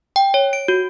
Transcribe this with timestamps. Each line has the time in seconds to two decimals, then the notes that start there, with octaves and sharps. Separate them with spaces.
0.16 G5
0.34 C#5
0.53 D7
0.68 F#4